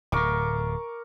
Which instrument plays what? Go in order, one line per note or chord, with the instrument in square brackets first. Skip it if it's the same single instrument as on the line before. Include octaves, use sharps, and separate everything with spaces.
[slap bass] D1 A2 [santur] A#4 C#6 D6